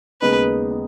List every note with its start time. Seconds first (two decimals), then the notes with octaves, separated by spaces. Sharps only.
0.21 D#2 C#3 G#3 B3 D#4 B4
0.71 D#4